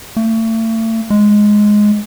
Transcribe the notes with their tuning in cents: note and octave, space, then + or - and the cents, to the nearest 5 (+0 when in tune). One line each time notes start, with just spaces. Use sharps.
A3 +35
G#3 +5